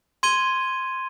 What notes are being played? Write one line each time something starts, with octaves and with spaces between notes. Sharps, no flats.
C6 G#6 D#7 G7